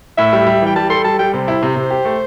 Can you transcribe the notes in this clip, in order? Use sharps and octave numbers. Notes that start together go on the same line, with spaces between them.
A2 E5
G3
G3
E3 G5
G3 A5
A4 C6
G3 A5
G3 G5
C3 C5
E4
C3
C3
G4
A3